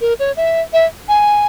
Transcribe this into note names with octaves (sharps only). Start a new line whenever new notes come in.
A#4
C#5
E5
E5
G#5